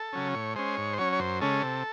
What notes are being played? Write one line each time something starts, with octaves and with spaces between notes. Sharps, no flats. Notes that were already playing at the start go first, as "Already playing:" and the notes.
Already playing: A4
C#3 F#3 C#4
A2 C#5
G#3 C#4 C5
G#2 C#5
C5
F#3 C#4 C#5
C#5
F#2 C5
C#3 G#3 C#4 A4
C3